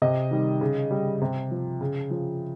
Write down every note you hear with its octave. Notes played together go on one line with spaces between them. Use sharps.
C3 D#5
D#3 G3
C#3
G3
C3
F3
C#3
F3